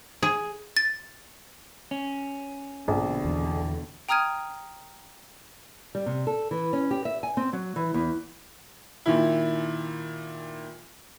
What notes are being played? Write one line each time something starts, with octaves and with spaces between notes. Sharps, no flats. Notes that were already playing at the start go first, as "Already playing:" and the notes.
G#4
A6
C#4
A#1 B2 D3
E2
G5 A#5 D#6 F6 G#6 D#7
G3
C3
A4
E3
C#4
G4
E5
G#5
C4
F#3
E3
E2
A#2 D#3 E4